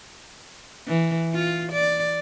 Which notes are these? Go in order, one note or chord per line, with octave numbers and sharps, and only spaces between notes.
E3
F4
D5